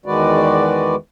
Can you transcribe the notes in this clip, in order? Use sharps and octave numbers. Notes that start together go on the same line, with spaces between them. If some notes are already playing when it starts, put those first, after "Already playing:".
E2 D#3 G#3 F#4 B4 D5